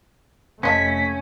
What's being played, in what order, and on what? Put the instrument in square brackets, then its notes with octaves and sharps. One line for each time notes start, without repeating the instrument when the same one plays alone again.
[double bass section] F1 A3 [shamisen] C4 D#5 A5 [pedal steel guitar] C#4 [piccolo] B6